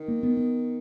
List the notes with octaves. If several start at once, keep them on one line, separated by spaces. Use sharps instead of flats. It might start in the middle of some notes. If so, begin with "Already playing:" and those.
Already playing: D#3
A#3
B3
B3